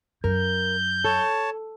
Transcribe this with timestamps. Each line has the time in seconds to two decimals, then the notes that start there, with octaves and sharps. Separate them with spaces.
0.24 F#2 A#4 G6
1.04 A4 C#5 A5